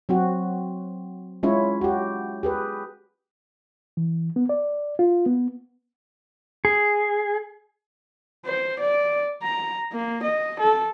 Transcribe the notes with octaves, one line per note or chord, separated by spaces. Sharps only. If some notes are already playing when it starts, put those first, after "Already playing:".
F#3 C4 F#4
G#3 C#4 E4 F4 C#5
F#4 G4
G4 G#4 B4
E3
B3
D5
F4
B3
G#4
C5
D5
A#5
A#3
D#5
A4